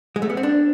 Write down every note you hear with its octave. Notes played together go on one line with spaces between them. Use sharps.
G#3
A3
B3
C4
D4